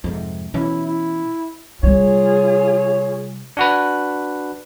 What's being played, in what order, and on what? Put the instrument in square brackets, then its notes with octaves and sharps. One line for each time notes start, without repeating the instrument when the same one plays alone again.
[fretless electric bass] F2 G#2 C3
[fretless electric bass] B2 E3 C#4 [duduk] E4
[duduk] E4
[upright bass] C3 G3 [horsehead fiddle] F4 G#4 [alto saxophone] C#5
[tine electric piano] D4 F#4 B4